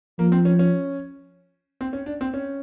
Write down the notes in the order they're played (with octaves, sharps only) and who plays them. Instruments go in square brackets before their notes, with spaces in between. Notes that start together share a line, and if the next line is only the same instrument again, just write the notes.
[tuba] F3 [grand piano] A#3
[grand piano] C4
C#4
C#4
C4
C#4
D4
C4
C#4